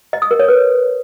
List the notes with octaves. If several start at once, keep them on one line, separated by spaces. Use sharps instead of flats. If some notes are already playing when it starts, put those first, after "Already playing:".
D#5
D#6
A#4
C#5
B4